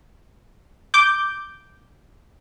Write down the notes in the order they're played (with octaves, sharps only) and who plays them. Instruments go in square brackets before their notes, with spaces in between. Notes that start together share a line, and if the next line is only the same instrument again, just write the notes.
[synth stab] D6 G6